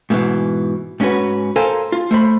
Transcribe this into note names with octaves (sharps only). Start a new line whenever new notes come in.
G#2 B2 D3 E3
G#2 C#4 D#4 F#4 B4
A4 A#4 C5 F5 G#5
F4
A3 C5 B5